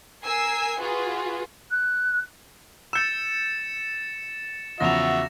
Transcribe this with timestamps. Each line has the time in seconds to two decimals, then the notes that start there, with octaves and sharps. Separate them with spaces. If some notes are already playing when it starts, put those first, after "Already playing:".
0.24 A#4 G#5 E6 C7
0.78 F4 F#4 G#4 B4
1.71 F#6
2.93 E6 G6 A6 C#7 E7
4.80 E2 C#3 F3 F#4 E5 A#6 F7